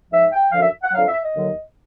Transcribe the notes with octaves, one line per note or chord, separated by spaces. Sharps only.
G#2 F3 E5
G5
F#2 D3 F3 F5
E5
F#5
F2 D3 F#3 F5
E5
D#5
D#2 D3 F#3